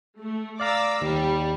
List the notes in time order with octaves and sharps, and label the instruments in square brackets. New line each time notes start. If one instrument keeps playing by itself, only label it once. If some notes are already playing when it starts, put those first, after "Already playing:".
[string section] A3
[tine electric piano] D5 F5 A#5 [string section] D6 E6
[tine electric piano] D#2 [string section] G3